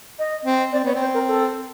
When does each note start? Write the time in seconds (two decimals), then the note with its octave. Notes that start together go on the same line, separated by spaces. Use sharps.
0.19 D#5
0.45 C4
0.72 C4 D5
0.84 B3 C#5
0.95 C4 C5
1.14 A#4
1.28 A4